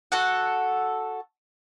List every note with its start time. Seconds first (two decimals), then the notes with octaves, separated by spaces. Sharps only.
0.12 F#4 A4 F#5